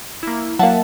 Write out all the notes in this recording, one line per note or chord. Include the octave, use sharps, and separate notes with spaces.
A#3 E4
F#3 A#3 E5 F#5 A5